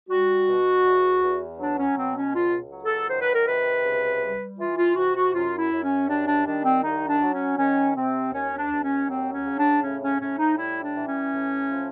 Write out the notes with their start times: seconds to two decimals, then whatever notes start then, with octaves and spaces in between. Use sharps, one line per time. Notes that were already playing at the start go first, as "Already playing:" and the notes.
0.09 G3 F#4
0.47 B2
0.84 E2
1.22 E2
1.59 F#3 D4
1.78 C#4
1.97 B2 C4
2.16 C#4
2.34 C#2 F4
2.72 F#3
2.84 A4
3.09 D#3 C5
3.21 B4
3.35 A#4
3.46 C3 B4
3.84 C#2
4.21 G3
4.58 E3 F4
4.78 F4
4.96 C3 F#4
5.15 F#4
5.33 F#2 F4
5.58 E4
5.71 F#2
5.83 C#4
6.08 G3 D4
6.27 D4
6.46 D#3 D4
6.65 C4
6.83 C2 D#4
7.08 D4
7.21 F#3
7.34 C#4
7.58 D#3 C#4
7.95 C3 C4
8.32 D#2 C#4
8.57 D4
8.70 D#2
8.84 C#4
9.08 F#3 C4
9.33 C#4
9.45 C#3
9.58 D4
9.83 A2 C#4
10.02 C#4
10.20 A2 C#4
10.38 D#4
10.57 G3 E4
10.83 D4
10.95 E3
11.08 C#4
11.32 A2
11.70 F3